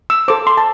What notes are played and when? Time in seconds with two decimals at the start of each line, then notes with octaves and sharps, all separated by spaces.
0.10 E6
0.28 A4 C5 D6
0.47 C6
0.57 A5